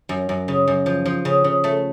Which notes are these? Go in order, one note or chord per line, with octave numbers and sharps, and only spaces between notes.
F#2
F#2
C#3
F#2
F3
F3
C#3
C#3
A3